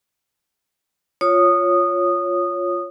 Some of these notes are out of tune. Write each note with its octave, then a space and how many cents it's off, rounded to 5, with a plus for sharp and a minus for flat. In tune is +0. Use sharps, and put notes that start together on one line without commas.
F4 +5 C#5 +0 D#6 -15